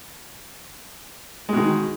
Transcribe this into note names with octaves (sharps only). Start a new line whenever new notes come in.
B2 D#3 G#3